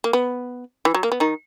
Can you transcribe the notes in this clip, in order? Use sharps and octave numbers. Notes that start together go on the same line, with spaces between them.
A#3
B3
E3
F#3
A#3
B3
D#3 D#4